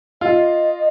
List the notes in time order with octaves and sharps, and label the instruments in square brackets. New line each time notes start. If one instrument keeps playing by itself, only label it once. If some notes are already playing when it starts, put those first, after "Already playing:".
[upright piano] F4 [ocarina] D#5